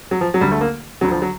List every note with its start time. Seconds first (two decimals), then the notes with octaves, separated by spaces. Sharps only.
0.11 F#3
0.21 F3
0.34 F#3
0.41 D2 D3 G3
0.52 A3
0.61 A#3
1.01 D2 D3 F#3
1.11 F3
1.22 F#3